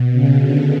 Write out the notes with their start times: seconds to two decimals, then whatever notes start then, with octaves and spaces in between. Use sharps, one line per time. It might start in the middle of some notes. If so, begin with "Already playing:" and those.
Already playing: B2
0.12 C#3
0.42 D3